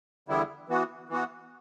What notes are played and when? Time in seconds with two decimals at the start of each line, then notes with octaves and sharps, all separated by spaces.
0.28 E2 D3 G3 B3 E4
0.69 E3 B3 F#4
1.09 E3 B3 F#4